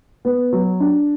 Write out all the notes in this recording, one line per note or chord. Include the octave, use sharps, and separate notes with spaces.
B3
F#3
D4